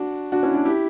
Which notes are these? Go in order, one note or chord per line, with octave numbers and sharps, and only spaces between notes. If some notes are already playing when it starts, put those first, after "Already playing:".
Already playing: D4 F#4
D4 F#4
C#4 E4
D4 F#4
E4 G4